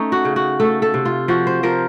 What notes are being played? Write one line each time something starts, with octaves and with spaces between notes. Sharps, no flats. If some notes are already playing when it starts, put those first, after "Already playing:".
Already playing: A3 C#4 D#4
F#4
C#3
F#4
A3 A4
A4
C3
F4
F3 F#4
C5
F3 A#4